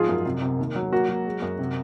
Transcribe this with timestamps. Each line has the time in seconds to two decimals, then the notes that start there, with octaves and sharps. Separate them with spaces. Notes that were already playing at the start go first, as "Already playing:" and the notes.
Already playing: G#2 F3 F4 G#4
0.08 F#2
0.25 C3
0.42 C3
0.59 D#2
0.76 F#3
0.92 A#3 F#4
1.08 F#3
1.26 G#3
1.42 F#2
1.59 C3